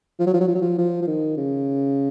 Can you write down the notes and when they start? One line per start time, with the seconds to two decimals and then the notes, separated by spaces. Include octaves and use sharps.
0.19 F3
0.26 F#3
0.34 F3
0.40 F#3
0.48 F3
0.55 F#3
0.61 F3
0.78 F3
1.02 F3
1.07 D#3
1.37 C#3